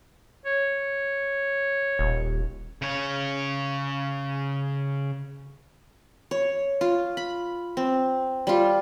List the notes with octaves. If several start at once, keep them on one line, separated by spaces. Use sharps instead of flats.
C#5
D#1
C#3 C#5
C#5
F4
B5
C4
G3 F4